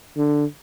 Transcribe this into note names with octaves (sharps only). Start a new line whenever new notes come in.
D3